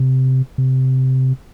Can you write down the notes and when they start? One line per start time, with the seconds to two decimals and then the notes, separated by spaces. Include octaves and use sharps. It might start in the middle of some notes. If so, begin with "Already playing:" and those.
Already playing: C3
0.58 C3